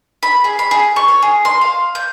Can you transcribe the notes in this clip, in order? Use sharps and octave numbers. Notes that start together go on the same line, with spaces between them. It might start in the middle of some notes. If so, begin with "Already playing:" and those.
B5
G#4
B5
G#4
C#6
C#5
G#4
C6
F5
G6